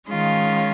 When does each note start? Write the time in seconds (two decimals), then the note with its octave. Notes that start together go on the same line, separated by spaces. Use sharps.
0.09 D#3 G#3 C#4 F4